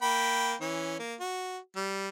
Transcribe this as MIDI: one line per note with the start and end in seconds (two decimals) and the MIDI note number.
0.02 0.54 58
0.02 0.54 79
0.02 0.54 83
0.60 0.96 52
0.60 0.96 61
0.99 1.15 58
1.20 1.58 66
1.76 2.09 55